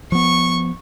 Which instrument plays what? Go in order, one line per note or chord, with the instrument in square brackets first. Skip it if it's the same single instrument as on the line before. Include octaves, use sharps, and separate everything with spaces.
[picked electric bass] F3 B3 [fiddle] C#6